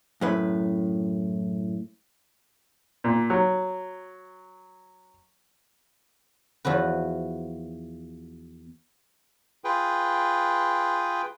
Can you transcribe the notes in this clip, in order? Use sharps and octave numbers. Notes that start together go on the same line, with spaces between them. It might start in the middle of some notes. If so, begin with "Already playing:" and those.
F#2 A2 B4
A#2
F#3
E2 F3 F#4 B4
F4 G#4 B4 G5